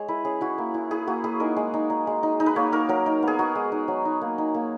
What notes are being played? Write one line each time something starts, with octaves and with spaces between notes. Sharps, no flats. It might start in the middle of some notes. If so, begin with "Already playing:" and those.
Already playing: G#3 C#5
E4 B4
C#4 G#4
E4 F#4
A#3
E4
E4 G#4
A#3 F#4
E4 G#4
D#4 A#4
G#3
D#4
D#4
G#3
D#4
D#4
B4
A#3 C#5
D#4 A#4
F#3 A#4
D#4
B3 G#4
D#4 F#4
G#3
D#4
F#3
D#4
A#3
D#4
A#3